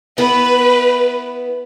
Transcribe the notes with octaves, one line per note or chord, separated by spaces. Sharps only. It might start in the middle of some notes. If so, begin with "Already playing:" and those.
B3 E4 B4